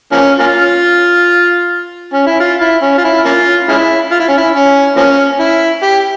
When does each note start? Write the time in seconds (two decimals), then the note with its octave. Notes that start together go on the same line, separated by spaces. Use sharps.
0.12 F3 A#3 C#4
0.39 A#3 C#4 F4
2.13 C#4
2.26 E4
2.40 F4
2.61 E4
2.82 C#4
2.98 F4
3.05 E4
3.25 A#3 C#4 F4
3.69 G#3 C#4 E4
4.12 F4
4.20 E4
4.28 C#4
4.38 E4
4.55 C#4
4.96 F3 A#3 C#4
5.40 E4
5.82 G4